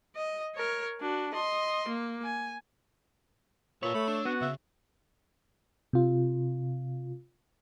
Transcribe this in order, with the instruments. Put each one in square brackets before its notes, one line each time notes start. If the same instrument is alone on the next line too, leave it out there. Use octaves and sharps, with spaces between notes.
[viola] D#5
A#4 C#5
D4 F#4
D#5 C6
A#3
G#5
[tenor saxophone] A#2 [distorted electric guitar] B4 A5 [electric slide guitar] C#5 [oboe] E6
[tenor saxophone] A3 [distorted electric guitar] B5
[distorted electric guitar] D4
[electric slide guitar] B3 [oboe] F#4
[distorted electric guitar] C#3 [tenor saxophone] E5
[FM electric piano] C3 F4